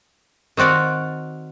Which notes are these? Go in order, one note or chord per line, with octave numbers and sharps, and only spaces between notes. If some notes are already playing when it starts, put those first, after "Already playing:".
D#3 C4 F#4 D5 F5